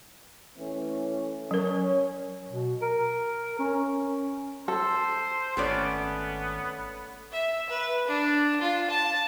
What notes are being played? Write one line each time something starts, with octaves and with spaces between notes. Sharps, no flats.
E3 A3 C#4
F#3 C#4 A#4
B2
A#4
C#4
A4 C5
G#1 A3 B3 C#4 D5
E5
B4
D4
F4
A5